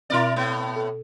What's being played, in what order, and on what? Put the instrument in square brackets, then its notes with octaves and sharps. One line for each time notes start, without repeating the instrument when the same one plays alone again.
[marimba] B2 C4 [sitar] E4 A#4 D5
[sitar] A2 B3
[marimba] A4